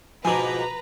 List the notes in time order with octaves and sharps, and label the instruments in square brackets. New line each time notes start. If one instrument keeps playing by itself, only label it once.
[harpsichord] G#2 B2 D#3 [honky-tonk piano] F3 D6 [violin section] B4 A#5 [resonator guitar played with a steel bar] G#5